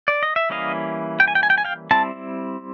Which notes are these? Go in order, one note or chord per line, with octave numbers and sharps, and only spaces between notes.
D5
D#5
E5
E3 G3 A#3 C#4 E4 D#5 F5
G5
G#5
G5
G#5
G5
G#5
F5 G5
G3 C4 E4 A5